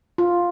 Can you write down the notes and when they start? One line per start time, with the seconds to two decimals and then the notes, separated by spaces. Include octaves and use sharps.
0.18 F4